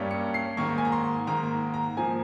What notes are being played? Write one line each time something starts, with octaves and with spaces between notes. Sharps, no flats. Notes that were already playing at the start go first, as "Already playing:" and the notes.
Already playing: G2 G3 A#3 C#4
C#7
C7
G#2 D#3 A#3 C#6
G#5
A#5
C6
G#2 D#3 A#3 A#5
A#5
G#2 F3 A#3 G#5